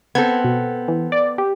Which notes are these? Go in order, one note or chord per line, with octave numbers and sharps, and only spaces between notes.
B3 C4 A4 G#6
B2
E3
D5
G4